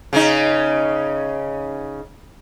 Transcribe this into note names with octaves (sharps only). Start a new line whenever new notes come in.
C#3 C#4 D#4